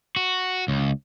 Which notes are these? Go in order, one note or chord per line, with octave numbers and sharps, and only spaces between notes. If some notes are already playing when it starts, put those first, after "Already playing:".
F#4
C#2